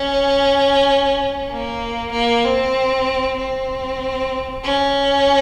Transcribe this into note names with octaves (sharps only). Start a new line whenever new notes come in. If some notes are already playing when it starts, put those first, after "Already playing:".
Already playing: C#4
A#3
A#3
C4
C4
C#4